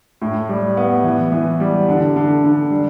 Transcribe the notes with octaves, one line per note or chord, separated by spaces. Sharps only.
A2
G3
B3
E3
E3
G3
D3
D3
D3
G3